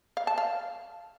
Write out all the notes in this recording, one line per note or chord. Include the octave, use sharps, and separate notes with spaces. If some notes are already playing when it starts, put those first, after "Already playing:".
F5
A5
F5